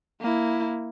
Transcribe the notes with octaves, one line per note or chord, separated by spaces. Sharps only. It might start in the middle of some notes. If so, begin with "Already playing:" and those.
A#3 E4